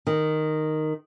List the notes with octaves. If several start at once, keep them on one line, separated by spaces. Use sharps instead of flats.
D#3